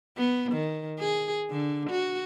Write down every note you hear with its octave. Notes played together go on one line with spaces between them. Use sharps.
B3
D#3
G#4
D3
F#4